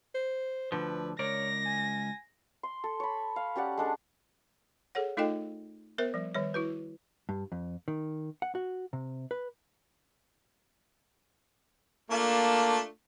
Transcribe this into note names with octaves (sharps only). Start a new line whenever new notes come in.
C5
D2 D3 F3 B4
C#2 A#4 C#5 D5 A#6
G#5
C6
A4
C#5 B5
F5
C#4 G4 D5 F#5
G#3 D4 A4
G#4 A4 C#5 F#5
A3 D#4 F4 A4 D#5 G5
B3 A#4 C5 E5
F3 G3
D#3 G3 C#5
E4 F#4 B4
G2
F2
D#3
F#5
F#4
C3
B4
A3 A#3 D4 F4